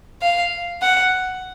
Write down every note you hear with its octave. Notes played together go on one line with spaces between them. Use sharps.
F5
F#5